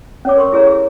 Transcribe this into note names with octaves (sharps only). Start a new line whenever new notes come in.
C#4 C#5 D6
A#4 C6 C#6
E4 G#4 C#5 A#5
G#4